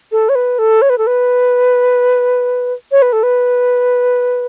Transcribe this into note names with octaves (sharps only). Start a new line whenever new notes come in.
A4
C#5
B4
A4
C#5
B4
A4
B4
C#5
B4
A4
B4